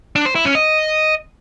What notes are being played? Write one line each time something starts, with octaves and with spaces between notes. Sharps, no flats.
D4
C5
E4
C#4
D#5